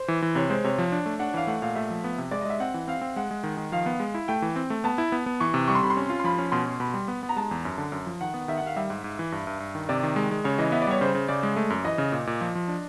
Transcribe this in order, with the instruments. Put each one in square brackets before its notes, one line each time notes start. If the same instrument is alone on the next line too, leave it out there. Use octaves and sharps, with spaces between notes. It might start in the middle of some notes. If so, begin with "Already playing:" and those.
Already playing: [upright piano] C5
[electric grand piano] E3
E3
[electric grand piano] C3 [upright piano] C#5
[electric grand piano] G#3 [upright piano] C5
[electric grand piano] C3 [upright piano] C#5
[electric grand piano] F3
D4
A3
[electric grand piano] D4 [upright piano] F#5
[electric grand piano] E3 [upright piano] F5
[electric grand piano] A3 [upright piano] F#5
[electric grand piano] A#2 [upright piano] F5
[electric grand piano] A3 [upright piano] E5
[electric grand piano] F3
B3
C3
[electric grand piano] G#3 [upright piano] D5
[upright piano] D#5
[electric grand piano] G#3 [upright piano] E5
[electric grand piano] C4 [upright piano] F#5
[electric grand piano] E3
[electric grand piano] C4 [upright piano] F5
[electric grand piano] C4
[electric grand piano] G#3 [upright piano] F#5
[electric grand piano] G#3
D#3
D#3
[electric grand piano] F3 [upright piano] F5
[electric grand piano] B3
G#3
E4
[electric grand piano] A3 [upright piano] G5
[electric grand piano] E3
C4
A3
[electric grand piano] B3 [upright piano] A5
[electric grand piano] E4
B3
B3
[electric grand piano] E3 [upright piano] C#6
[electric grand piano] C3
[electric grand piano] G3 [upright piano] C#6
[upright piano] C6
[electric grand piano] C3 [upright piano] B5
[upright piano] C6
[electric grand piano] C#4
F4
[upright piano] C6
[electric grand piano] F3 [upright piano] B5
[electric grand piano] C#4
[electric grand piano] B2 [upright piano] C6
[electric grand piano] B2
[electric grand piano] B2 [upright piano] B5
[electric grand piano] G3
B3
B3
[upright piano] A#5
[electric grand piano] G#3 [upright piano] A5
[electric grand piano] E2
F#2
D3
F#2
F3
[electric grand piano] D#3 [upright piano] F#5
[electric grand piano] B3
[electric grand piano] D#3 [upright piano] E5
[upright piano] F#5
[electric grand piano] D#3 [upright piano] F5
[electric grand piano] G3 [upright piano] E5
[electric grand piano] G#2
G#2
E3
G2
G2
G2
D#3
[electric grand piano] C3 [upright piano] D5
[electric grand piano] D#3
G#3
G#3
[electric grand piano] C#3 [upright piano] C#5
[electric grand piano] E3 [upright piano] D#5
[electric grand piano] B3 [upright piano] E5
[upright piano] D5
[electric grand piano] G3 [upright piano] C#5
[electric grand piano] C#3 [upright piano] C5
[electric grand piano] C#3
[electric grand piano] C#3 [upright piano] D5
[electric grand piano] G#3
A3
F#2
[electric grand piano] E3 [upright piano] D#5
[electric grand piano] C#3
A#2
A#2
F3
F3
D4